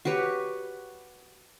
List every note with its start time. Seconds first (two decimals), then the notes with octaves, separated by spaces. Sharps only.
0.05 F#4 G4 B4 C#5